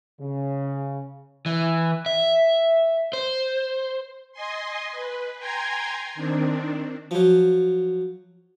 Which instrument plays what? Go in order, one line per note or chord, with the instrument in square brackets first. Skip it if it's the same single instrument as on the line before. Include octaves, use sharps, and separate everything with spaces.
[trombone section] C#3
[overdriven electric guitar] E3
E5
C5
[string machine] D#5 G#5 C6
B4
G5 G#5 A#5 C6 G#6
D#3 C4 D4
[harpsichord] F3 F#3